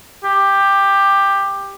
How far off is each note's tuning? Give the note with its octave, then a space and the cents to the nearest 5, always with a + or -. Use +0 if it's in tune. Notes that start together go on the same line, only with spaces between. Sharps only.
G4 +10